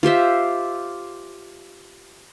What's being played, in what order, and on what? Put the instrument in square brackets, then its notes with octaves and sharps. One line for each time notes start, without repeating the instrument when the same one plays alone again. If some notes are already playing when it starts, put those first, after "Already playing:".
[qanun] F4 G4 C5 E5